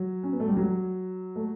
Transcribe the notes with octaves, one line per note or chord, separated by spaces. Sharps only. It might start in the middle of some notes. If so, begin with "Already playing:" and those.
Already playing: F#3
C#4
B3
A3
G3
F#3
A3